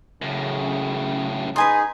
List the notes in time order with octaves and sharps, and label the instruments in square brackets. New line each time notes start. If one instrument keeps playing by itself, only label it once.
[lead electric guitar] F#2 A2 [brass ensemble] C#3
[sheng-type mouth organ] D#4 G#4 [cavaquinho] B4 G#5 C6